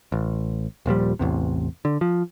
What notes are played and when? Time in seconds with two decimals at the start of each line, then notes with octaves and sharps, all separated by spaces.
0.12 A1
0.86 D#1 A#2 F3 G3
1.19 A1 E2 C3
1.85 D3
2.01 F3